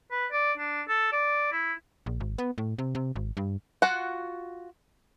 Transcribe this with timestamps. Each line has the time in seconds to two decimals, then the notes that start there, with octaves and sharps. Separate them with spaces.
0.11 B4
0.32 D5
0.57 D4
0.88 A4
1.12 D5
1.52 E4
2.06 A#1
2.20 G#1
2.38 B3
2.58 A2
2.79 C3
2.95 C3
3.16 G#1
3.37 G2
3.82 F4 F#4 F#5